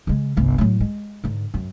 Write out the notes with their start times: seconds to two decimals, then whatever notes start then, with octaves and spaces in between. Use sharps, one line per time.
0.07 C#3 G#3
0.37 G1 C2
0.58 A2 F#3
0.81 G#3
1.24 G#2 D3
1.54 F#2